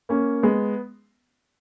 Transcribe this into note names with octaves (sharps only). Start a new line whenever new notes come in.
A#3 C#4
G#3 B3